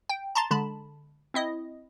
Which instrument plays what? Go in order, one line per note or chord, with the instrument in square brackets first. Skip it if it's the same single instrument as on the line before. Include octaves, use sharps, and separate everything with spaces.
[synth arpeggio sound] G5
A5 A#5 C6 A6
D3 G#3 A5 B5
C4 E4 D#5